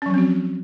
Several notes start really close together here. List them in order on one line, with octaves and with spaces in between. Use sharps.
C#4 F#3 F3 C4 F#4